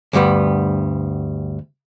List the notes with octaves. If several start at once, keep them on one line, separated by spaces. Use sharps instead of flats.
D2 G2 G3 B3